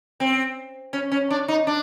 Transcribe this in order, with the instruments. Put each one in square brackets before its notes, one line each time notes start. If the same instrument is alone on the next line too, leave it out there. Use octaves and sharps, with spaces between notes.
[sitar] C4
C#4
C#4
D4
D#4
D4